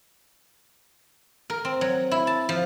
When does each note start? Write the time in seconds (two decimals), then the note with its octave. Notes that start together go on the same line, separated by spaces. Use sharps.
1.50 A#4
1.65 C4
1.81 F#3
2.11 E4
2.27 A5
2.49 F3